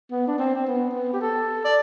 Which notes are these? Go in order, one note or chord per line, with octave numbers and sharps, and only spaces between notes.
B3
D4
C4
C4
B3
B3
G4
A4
D5